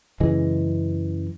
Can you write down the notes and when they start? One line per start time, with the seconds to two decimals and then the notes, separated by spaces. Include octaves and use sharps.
0.20 F#2 C#3 E3 G#3